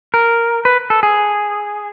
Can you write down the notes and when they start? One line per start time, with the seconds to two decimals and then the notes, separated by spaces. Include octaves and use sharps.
0.14 A#4
0.65 B4
0.90 A4
1.03 G#4